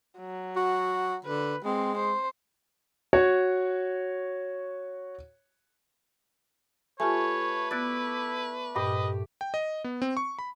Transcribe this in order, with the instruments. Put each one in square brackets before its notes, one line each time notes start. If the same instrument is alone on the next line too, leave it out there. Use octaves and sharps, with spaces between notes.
[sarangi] F#3
[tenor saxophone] F#4
[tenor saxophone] D3 [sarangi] B4
[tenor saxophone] G#3 [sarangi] C4
[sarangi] C5
[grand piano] F#4 C#5
[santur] A3 [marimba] F4 G4 G#5 [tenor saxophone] B4 [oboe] C#5
[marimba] B3 F#6 A6 [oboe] E4 [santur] D5
[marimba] G2 A#2 [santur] G4 [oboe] D#5
[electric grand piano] G5
D#5
B3
C4
C#6
B5